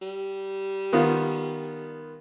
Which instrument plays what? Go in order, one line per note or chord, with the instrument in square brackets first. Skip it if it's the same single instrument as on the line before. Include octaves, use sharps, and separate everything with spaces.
[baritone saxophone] G3
[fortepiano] D#3 B3 F4